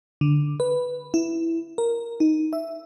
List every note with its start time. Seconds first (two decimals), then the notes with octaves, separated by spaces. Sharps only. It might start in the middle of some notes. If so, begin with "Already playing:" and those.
0.21 D3
0.60 B4
1.14 E4
1.78 A#4
2.20 D#4
2.53 E5